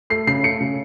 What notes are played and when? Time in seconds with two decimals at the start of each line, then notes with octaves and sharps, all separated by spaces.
0.10 A3 C7
0.27 C#3 C7
0.43 A3 C#7
0.61 C#3